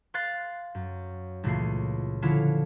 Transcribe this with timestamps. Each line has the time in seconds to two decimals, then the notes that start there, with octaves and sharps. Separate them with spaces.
0.14 F5 C6 F#6 A6 C7
0.75 F#2
1.43 C#2 A#2 E3 A3 C7
2.22 D3 F3 C#4 E4 F4